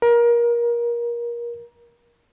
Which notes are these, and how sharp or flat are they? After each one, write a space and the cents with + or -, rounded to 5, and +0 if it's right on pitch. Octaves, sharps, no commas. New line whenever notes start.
A#4 +25